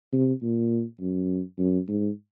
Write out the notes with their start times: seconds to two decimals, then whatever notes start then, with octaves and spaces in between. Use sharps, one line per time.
0.12 C3
0.42 A#2
1.00 F#2
1.58 F#2
1.89 G#2